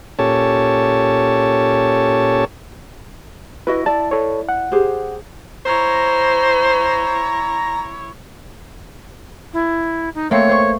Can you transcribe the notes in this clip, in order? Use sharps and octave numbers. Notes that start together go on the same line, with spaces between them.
A#2 C#4 G4 A4 C#5 A5
E4 F#4 B4 D#5
E4 D5 A5
A4 C#5
F#5
G4 G#4 C5
E4 C5 C#5 A#5
E4
D#4
A3 A#3 C4 C#5
C5 C#6